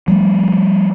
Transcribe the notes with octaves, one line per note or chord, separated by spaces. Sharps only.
F3 G3 A3